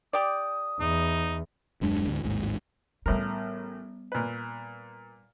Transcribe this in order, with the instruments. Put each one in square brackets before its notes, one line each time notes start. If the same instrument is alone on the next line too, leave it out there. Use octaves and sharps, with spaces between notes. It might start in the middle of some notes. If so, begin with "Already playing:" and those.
[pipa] G4 D5 [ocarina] D#6
[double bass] E2 [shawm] D#4
[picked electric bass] D#1 F#2 G#3 D4
D2 G#2
A1 D#2 G#2
[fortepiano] A1 A2 A#4 [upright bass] G3 B3
[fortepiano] A#2 B4